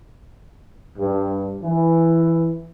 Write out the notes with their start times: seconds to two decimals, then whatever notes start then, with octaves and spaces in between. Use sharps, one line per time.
0.97 G2
1.62 E3